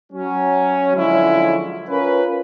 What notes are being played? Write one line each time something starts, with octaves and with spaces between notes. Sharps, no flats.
F#3 C#4
D3 F3 F#3 G#3 C#4 E4
C#4 F4 A#4 B4